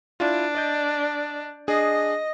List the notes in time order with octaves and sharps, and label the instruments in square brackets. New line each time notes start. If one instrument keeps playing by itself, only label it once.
[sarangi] D4 [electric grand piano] E4 F4
[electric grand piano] D5 D#5 G6
[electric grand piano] D4 G#4 [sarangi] D#5